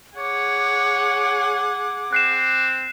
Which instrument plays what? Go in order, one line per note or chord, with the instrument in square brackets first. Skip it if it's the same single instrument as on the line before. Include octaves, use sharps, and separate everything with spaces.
[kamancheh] G#4 F#5 [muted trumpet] C#5 [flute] D6
[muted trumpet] C4 [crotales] F#6 C7 E7